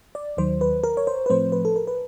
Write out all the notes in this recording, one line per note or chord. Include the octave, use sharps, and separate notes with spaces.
D5
D#2 D#3 F#3 C5
B4
A#4
C#5
C5
B4
A2 F3 A3 C4 C5
B4
A4
A#4
B4